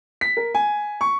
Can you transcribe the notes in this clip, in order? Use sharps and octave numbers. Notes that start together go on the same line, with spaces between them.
B6
A#4
G#5
C#6